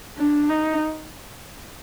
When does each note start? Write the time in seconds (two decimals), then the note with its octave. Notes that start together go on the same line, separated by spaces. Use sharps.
0.18 D4
0.49 D#4